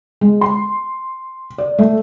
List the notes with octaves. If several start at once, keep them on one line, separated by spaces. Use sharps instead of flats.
G#3
C6
D5
A3